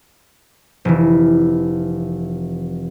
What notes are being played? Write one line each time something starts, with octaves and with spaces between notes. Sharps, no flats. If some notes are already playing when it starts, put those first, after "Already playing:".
F1 E3